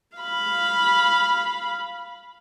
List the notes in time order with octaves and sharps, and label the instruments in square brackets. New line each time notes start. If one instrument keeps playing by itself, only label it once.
[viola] F5 B5